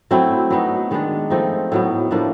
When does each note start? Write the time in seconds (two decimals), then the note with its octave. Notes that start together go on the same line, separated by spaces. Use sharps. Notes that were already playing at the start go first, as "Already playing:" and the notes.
0.11 F#3 A3 C4 E4
0.51 F#3 B3 D#4
0.91 D#3 G#3 B3 D4
1.30 F3 A3 C4 D#4
1.72 A2 F#3 B3
2.11 A2 F3 A#3 D4